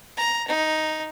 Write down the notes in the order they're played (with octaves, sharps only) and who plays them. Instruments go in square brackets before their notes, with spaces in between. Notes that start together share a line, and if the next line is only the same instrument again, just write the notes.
[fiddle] A#5
D#4